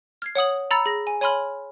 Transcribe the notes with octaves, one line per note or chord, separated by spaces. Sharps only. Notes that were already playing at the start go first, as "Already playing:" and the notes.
F6 G#6 C7
C#5 F#5 D#6 F#7
A#5 B5 E6 A6 C#7
G#4 A#6
G#5
C#5 G#5 B5 C6 F6 F#7